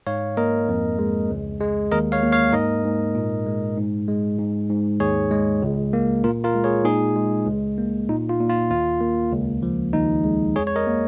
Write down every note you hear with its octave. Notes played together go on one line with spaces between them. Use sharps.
G#2 C#5 F5
A#3 A#4 D#5
F2
G#3
C#2
G#3
D#2 A#4 D#5
C#5 F5
A#3
C#5 F5
G#2 A#4 D#5
G#2
A#2
G#3
G#2
G#3
G#2
G#2
D#2 G#4 C#5
G#3
C#2
A#3
A#2 F4 A#4
F4 A#4
G#3
G#4 C#5
A#2 D#4 G#4
G#3
C#2
A#3
A#2 D#4
F4
A#2
F4
D#2 F4
A#3
C#2
F3
D#2 D#4
G#3
F2 G#4 C#5
C#5
A#4 D#5
A#3